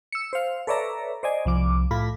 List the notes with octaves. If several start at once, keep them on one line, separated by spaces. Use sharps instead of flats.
E6 C#7
C5 F5
A4 B4 C#5 D5 E5 A#5
C5 D5 D#5 G#5
C2 F3 D6
A2 A3 F4 B5